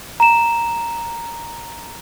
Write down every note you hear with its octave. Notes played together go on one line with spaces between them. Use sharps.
A#5 E7